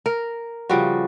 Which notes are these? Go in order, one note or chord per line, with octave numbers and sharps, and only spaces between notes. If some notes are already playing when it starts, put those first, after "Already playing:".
A#4
C#3 F3 G3 F#4